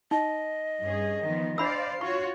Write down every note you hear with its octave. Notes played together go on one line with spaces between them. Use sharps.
D#4 D#5
G2 C#4 G#4
D#3 F3 B3
D4 C5 D5 F5 B5 E6
F4 F#4 C#5 C#6